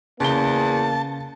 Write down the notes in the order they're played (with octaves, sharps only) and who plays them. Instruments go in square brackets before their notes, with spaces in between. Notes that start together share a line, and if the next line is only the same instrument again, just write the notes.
[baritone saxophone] E2 [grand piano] C#3 G7 [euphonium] A#3 [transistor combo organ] A5